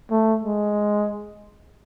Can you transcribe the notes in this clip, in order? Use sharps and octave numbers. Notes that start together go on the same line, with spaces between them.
A3
G#3